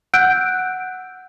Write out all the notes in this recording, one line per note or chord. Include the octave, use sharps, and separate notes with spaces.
F#5 E6 F#6 G6 D7